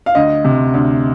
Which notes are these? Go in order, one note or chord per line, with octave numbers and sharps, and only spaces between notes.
F5
D2 D#5
C3
D2